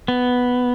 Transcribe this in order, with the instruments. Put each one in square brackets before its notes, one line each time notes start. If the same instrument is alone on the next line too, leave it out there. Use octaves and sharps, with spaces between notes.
[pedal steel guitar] B3